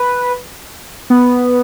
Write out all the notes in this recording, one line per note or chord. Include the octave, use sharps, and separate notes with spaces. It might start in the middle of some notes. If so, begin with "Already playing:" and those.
Already playing: B4
B3